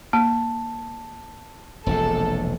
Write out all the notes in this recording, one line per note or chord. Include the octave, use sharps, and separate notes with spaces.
A#3 A5
E1 A#1 C3 A4